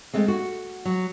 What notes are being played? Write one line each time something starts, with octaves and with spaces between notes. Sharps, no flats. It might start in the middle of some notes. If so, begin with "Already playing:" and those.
G#3 A3 C4
F#4
F#3